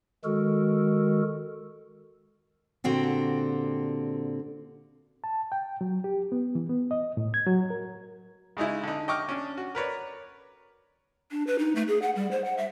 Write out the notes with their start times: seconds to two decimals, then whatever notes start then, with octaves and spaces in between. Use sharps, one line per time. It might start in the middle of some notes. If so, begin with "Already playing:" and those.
0.24 D#3 G#3 F#4 A4 A#4
2.84 A#2 D3 C4 F#4 G4
5.24 A5
5.52 G5
5.81 F#3
6.04 G4
6.32 B3
6.55 E3
6.69 B3
6.91 D#5
7.17 A2
7.34 G#6
7.46 F#3
7.70 A#4
8.57 C#3 G#3 D#4 E4
8.83 D3 D#4
9.08 D#5 G5 C#6 D6 F6
9.29 C#4 D4
9.58 F#4
9.75 A#4 B4 C#5 D5
11.31 D4
11.47 B4
11.59 D#4
11.75 A3
11.88 G#4
12.02 F#5
12.16 G3
12.31 C5
12.45 F#5
12.58 E5